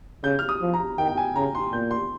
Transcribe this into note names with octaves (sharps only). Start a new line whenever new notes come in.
C#3 G6
F6
D#6
F3
A#5
D#3 G5
G5
G#5
C#3 A#5
C6
A#2 G6
C6